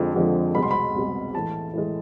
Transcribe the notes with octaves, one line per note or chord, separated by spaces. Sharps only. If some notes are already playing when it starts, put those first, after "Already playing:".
Already playing: F2 D3 F3 G#3
F2 D3 F3 G#3
C2 B2 G#3 B5
C6
B5
C2 B2 G#3
A2 E3 G#3 A5
A2 E3 G#3